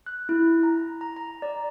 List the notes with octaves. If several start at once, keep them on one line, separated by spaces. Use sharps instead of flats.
F#6
E4
A#5
A#5
A#5
D5